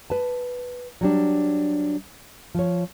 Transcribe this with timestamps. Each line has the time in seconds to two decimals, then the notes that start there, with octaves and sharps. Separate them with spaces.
0.10 B4 A5
1.01 F#3 G3 D4
2.55 F3 C#5